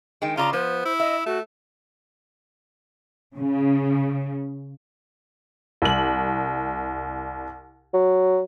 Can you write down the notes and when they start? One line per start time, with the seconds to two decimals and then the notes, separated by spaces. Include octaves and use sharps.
0.22 D#3 G#3 G5
0.37 C#3 F4 D5 A5 A#5
0.53 F3 B3 C5
0.85 E4
1.00 D#5 E5
1.26 A3 F#4
3.37 C#3
5.82 C2 F#7
7.94 F#3